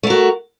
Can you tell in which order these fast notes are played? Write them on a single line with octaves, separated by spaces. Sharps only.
A3 A#4 F#4